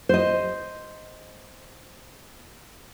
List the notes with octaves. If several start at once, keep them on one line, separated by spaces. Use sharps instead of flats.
C5 D#5